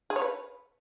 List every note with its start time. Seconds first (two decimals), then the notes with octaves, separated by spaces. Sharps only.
0.10 G#4
0.16 C#5
0.22 B4